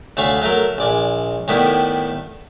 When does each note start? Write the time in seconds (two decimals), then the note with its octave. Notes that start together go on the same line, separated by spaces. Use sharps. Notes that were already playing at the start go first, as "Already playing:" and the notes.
0.17 D2 A3 C#5 F5 G#5 B5
0.42 F#3 A3 A#4
0.78 A#1 D5 G#5
1.48 A2 D#3 G3 B3 E4